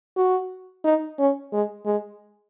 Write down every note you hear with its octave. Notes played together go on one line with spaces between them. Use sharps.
F#4
D#4
C#4
G#3
G#3